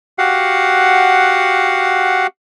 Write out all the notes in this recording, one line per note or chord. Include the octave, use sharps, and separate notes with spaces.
F#4 G4 F5 F#5